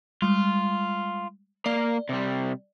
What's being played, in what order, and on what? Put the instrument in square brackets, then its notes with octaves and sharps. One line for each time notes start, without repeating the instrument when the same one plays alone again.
[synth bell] G3 G#3 [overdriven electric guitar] F4
[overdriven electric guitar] A#3 F5 [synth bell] D5
[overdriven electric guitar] C3 G3